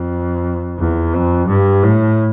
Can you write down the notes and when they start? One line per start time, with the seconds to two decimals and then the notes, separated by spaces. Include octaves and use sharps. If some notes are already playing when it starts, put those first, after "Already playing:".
Already playing: F2
0.80 E2
1.14 F2
1.48 G2
1.83 A2